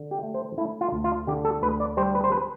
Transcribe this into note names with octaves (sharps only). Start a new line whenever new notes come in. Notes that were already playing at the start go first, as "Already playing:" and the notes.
Already playing: D3
G4
A3
C5
A3 E4
F4
D2
F4
D3 G4
A4
D2 B4
D5
G3 C5
B4
C5
B4